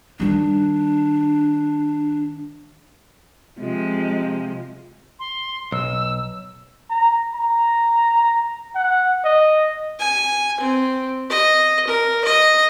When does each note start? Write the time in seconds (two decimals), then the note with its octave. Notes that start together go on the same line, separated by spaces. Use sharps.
0.20 D#3 G3 D4
3.60 C3 F3 G#3
5.19 C6
5.72 B1 E6
6.90 A#5
7.34 A#5
8.75 F#5
9.25 D#5
9.99 G#5
10.60 C4
11.30 D#5
11.87 A#4
12.25 D#5